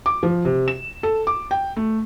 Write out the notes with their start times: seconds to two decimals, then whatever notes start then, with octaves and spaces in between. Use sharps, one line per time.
0.06 D6
0.23 F3
0.45 C3
0.68 E7
1.03 A4
1.27 D6
1.51 G5
1.77 A3